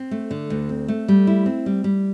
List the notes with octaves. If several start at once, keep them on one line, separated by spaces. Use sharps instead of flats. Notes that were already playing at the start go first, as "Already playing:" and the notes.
Already playing: C4
A3
D3
D2
C4
A3
G3
E4
C4
G3
G3